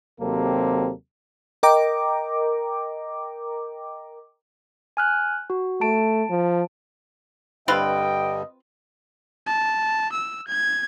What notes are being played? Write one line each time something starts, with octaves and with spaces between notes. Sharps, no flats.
D#2 C3 F#3 A#3 C4 A4
A#4 D#5 G5 A#5 D6
G#5 F6 F#6
F#4
A3 A5 D7
F3
G2 D3 G3 C4 F4 B4 D#5 G5
A5
E6
G#6